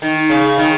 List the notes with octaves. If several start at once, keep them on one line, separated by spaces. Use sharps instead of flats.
D#3
C#3
D#3